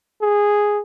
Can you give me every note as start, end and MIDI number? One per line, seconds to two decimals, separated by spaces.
0.22 0.80 68